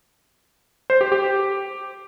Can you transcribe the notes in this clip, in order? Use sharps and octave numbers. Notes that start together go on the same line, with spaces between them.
C5
G4
G4